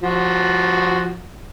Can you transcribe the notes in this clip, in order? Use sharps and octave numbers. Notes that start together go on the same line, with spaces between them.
F3 F#4